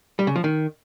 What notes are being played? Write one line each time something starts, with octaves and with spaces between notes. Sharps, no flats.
G3
C#3
F3
D#3